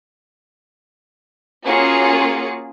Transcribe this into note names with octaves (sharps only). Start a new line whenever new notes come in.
A#3 C#4 F4 F#4 G#4 C#7